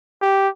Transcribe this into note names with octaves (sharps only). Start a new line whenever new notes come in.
G4